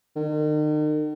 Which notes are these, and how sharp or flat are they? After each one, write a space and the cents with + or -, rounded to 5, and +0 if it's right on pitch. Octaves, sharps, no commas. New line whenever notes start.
D#3 -40